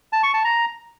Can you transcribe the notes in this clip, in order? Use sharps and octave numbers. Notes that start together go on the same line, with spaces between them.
A5
C#6
A5
A#5